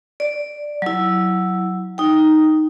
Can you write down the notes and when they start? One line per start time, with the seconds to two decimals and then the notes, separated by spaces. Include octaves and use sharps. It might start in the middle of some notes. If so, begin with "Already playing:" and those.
0.20 D5
0.82 F#3 E4
1.98 D#4 G5